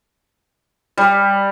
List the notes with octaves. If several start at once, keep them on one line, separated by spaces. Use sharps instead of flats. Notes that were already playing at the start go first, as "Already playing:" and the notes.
G3